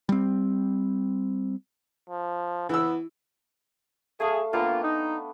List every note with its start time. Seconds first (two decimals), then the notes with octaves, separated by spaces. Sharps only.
0.09 G3 C4
2.09 F3
2.69 E3 B3 E6
4.20 A3 G#4 F5 A5
4.53 A#3 B3 D4 F4 G5
4.83 D#4